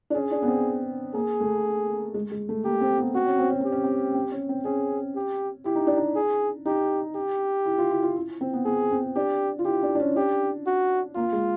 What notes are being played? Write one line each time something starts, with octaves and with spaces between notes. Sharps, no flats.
D4
C#4 G#4
D4
B3
C4
A#3 G#4
A3
G#3
G#3
A3
A#3 G4
C4
B3
C4 F#4
C#4
C4
C#4
C4 G4
C#4
C4
C4
C#4
C4
C#4 G#4
G4
E4 G4
D#4
D4
D#4
G#4
D#4 G4
G4
E4
F4
E4
F4
E4
C4
B3
B3 G#4
C4
D4 G4
F4
E4 G4
D4
D4
C#4
D4 G4
F#4
A#3 F4
G#3